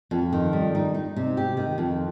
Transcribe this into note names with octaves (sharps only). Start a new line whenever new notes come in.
F2
D#3
G3
D#4
D#4
C3
G4
D#3
F2